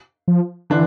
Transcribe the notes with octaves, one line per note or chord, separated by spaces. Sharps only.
F3
D3 E3 D4